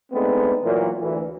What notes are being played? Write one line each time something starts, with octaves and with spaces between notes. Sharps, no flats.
G#3 A3 B3 C4 D4 D#4
A#2 E3 F#3
D2 E3